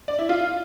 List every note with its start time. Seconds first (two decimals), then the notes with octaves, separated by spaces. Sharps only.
0.08 D5
0.19 E4
0.29 F4